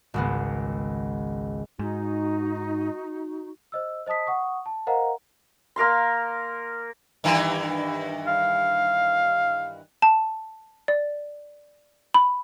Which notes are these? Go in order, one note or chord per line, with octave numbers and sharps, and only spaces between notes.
G#1 C#2 B3
G#2 D#4 F#4
C5 D#5 E6
C5 D#5 A5 D#6 B6
F#5 C#6 D#6
A5
A#4 C5 D#5 F5 F#5 A#5
A#3 A#4 F5 C6
G2 D#3 E3
F5
A5
D5
B5